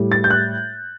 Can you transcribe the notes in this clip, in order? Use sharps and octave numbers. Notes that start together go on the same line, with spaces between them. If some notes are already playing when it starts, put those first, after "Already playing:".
Already playing: A2 G3
A6
G6
F#6